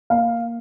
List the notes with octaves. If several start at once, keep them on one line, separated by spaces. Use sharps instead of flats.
A#3 F5